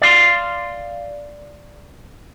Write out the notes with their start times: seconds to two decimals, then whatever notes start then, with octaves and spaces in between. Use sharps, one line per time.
0.02 D5 F5 C6